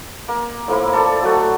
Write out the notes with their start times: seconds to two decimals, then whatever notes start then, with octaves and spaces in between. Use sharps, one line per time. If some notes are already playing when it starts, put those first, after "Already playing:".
0.28 A#3
0.68 A2 F3 A#3 E4
0.93 A4 D5 A5
1.22 F#3 A3 F#4